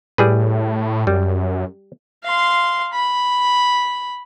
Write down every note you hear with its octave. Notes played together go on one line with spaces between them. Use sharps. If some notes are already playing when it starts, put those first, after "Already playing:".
A2 G3 G#4 B4
F#2 G3
F5 C6
B5